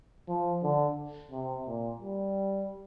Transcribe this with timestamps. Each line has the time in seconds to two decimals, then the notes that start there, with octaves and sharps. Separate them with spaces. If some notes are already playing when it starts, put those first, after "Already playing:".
0.28 F3
0.63 D3
1.31 C3
1.67 A#2
2.01 G3